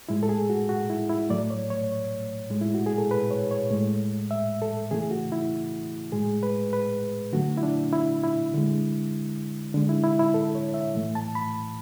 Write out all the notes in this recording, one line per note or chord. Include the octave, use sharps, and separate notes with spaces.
A2 G#3 E4
A4
G#4
F#4
F#4
E4
E4
A2 F#3 A3 D5
C#5
C#5
A2 G#3
E4
F#4
G#4
A4
B4
C#5
C#5
A2 G#3
E5
A4
C#3 E3 A3 G#4
F#4
E4
A2 G#3 G#4
B4
B4
D3 F#3 A3 F#4
E4
D4
E4
E4
D3 G#3
D3 G#3 D4
E4
E4
E4
A4
C#5
E5
A2 E3 A3
A5
B5